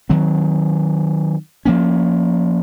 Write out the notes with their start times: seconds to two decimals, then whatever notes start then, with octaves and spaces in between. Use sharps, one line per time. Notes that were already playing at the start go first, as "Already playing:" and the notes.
0.09 D#3 F#3 C4
1.65 F3 A#3 C#4